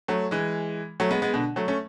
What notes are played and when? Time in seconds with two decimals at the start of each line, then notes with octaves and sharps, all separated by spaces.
0.08 F#3 A3
0.31 E3 G#3
1.00 F#3 A3
1.11 G#3 B3
1.22 G#3 B3
1.34 B2 D3
1.56 F#3 A3
1.68 A3 C#4